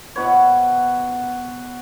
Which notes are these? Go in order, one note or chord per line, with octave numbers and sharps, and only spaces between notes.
B2 F#4 B4 C#5